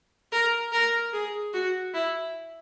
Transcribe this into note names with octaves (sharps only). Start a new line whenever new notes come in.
A#4
A#4
G#4
F#4
E4